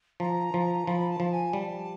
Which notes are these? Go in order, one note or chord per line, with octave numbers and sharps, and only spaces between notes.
F3 A#5
F3
F3 B5
A5
F3
G#5
G3 A5